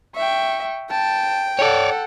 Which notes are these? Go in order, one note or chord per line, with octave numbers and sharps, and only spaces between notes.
E5 G5 C#6
G5 A5
A4 C#5 D5 F#5